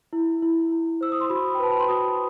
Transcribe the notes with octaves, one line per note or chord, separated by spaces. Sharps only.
E4
E4
E4
C5 E6
D#6
C6
F#4 B5
G5
B4 A5
B5
C6
F#4 D#6